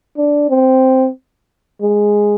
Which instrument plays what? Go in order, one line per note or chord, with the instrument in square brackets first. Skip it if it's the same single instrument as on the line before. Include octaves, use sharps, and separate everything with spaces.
[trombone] D4
C4
G#3